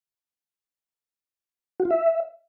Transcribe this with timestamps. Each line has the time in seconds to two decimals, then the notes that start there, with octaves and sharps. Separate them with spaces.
1.80 F#4
1.85 F4
1.91 E5